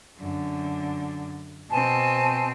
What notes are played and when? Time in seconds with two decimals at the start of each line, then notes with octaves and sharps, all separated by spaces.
0.20 F#2 D3
1.71 B2 C4 G#5 A5